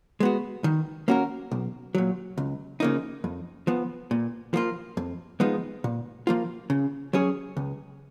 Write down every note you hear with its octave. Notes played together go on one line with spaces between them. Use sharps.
G#3 B3 F#4
D#3
A#3 C#4 F#4 A#4
B1
A#2 F#3
C#2
C#3 F3 A#3 D#4
F2
F3 B3
A#2
F3 A#3 F4
F2
F3 G#3 B3 D#4
A#2
F3 A#3 F4
C#3
F#3 C#4 G#4 C#5
C#2